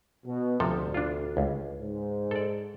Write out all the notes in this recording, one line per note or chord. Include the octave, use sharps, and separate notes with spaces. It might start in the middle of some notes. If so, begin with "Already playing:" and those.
B2
D2 C3 F3 A4
D4 F4
C#2
G#2
A4 D5